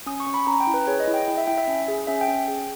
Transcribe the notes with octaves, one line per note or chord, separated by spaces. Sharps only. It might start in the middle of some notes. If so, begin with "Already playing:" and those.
C#4 D#6
C#6
C#4
B5
C#4 A#5
G5
E4
B4
G#4 C#5
D#5
E4
G5
E4 G5
E5
E4 G5
E5
C#4
G#4
C#4 E5
G5
C#4
G5
G#4